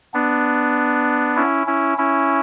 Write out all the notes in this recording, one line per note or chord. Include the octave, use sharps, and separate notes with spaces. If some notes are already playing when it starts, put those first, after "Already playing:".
B3 D4
C#4 E4
C#4 E4
C#4 E4